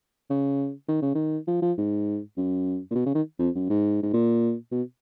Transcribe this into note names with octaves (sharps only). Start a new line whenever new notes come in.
C#3
D#3
C#3
D#3
F3
F3
G#2
F#2
A#2
B2
C#3
D#3
F2
F#2
G#2
G#2
A#2
B2